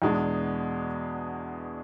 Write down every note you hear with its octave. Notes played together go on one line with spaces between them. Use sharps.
E2 B2 G#3 D4